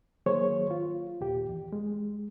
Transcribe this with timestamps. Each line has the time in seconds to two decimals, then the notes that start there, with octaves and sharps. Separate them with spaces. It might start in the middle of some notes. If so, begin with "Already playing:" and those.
0.26 D#3 F#3 A#3 G#4 C5 C#5
0.71 F4
1.21 D#2 A#2 G4
1.49 E2
1.73 G#3